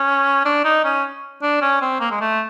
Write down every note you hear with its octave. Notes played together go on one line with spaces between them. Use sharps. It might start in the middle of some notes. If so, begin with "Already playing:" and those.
Already playing: C#4
D4
D#4
C#4
D4
C#4
C4
A#3
G#3
A3